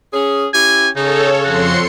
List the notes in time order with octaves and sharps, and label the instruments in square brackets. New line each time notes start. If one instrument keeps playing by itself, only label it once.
[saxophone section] C#4 G#4
[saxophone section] C#4 E4 G4 [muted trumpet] G#5
[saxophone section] C#3 [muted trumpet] D#4 [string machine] A4 C#5
[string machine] F2 C6 C#7 [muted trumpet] F#4